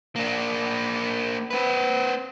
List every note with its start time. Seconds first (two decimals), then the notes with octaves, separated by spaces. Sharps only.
0.16 A#3 D4
1.50 C4 B4